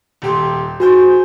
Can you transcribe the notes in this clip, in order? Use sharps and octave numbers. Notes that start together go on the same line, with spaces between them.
D#1 G4 C6
F#4 G#4 C5 G6